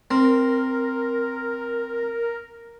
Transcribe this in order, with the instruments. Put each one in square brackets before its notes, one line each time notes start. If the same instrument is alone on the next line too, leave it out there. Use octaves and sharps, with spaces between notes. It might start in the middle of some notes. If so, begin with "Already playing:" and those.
[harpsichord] C4 [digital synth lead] A#4